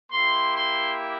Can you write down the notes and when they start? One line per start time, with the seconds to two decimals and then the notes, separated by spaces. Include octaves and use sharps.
0.12 A#3 E4 G4 C6
0.55 C6